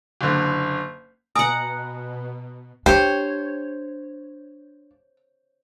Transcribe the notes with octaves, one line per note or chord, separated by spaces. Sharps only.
F#1 D3
B2 F#5 G#5 A#5 D#6
D4 G4 C5 C#5